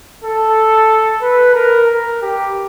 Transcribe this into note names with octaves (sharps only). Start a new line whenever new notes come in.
A4
B4
A#4
A#4
G4